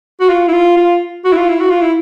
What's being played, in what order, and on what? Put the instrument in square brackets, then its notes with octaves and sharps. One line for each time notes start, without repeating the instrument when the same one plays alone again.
[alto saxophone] F#4
F4
E4
F4
F4
F#4
E4
F4
E4
F#4
F4
E4